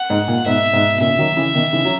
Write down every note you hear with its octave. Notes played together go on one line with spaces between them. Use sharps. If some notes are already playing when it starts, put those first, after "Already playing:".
Already playing: F#5
G#2
A#2
G#2 B2 E5
G#2 B2
B2
A#2 C#3 E5
D#3 F#3
C#3 E3
B2 D#3
C#3 E3
F#3